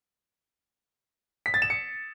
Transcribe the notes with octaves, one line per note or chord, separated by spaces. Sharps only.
B6
A6
E7
C#7